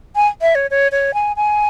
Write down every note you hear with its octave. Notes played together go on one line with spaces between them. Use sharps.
G#5
E5
C#5
C#5
C#5
G#5
G#5